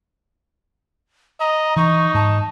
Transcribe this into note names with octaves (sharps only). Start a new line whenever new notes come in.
D#5 A#5
E3 D#4 C#6
G#2 A5